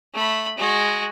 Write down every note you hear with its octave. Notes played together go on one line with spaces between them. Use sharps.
A3 B5
G#3 F#4